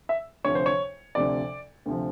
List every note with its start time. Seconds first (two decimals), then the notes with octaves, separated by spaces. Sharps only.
0.09 E5
0.44 D2 C3 F3 C#5
0.55 C5
0.66 C#5
1.15 D2 C3 F3 D5
1.86 D2 C3 F3